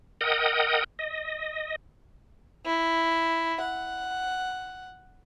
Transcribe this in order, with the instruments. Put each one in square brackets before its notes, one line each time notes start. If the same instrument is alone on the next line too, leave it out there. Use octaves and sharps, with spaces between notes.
[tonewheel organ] A#4 D#5 F#5 G5 D#6
D#5
[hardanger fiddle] E4
F#5